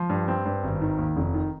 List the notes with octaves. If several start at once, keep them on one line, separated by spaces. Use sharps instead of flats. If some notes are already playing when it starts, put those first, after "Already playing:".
Already playing: F3
G2
C4
G2
G#1
D#3
D#2
F1
D#3